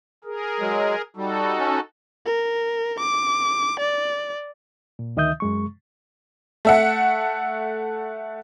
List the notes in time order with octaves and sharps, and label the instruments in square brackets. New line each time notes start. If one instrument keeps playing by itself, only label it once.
[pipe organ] G#4 A#4
[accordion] F#3 G#3
[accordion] G3 [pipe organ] D#4 F#4 A4
[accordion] C#4
[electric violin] A#4
D6
D5
[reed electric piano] A#2
D2 D#3 D#5 E5 D#6 G6
F#2 G#3 C#6
[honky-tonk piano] A3 E5 F#5